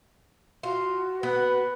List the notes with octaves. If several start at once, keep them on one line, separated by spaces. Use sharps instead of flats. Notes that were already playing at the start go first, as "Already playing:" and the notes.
F4 F#4
B3 B4